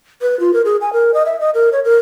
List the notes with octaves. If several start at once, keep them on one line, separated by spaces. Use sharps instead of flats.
B4
F4
A#4
G#4
G#5
A#4
D#5
E5
D#5
A#4
C#5
A#4